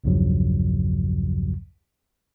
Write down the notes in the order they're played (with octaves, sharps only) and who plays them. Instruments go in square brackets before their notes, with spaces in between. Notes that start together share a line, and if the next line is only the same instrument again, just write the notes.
[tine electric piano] B1 E2 G2 C#3 F3 F#3